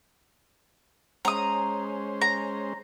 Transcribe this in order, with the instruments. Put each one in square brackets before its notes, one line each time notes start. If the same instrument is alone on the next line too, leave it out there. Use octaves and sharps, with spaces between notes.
[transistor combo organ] G#3 C#4 C5 [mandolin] A#5 D#6
[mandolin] A#5